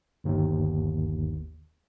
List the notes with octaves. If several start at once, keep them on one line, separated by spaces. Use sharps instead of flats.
G1 D#2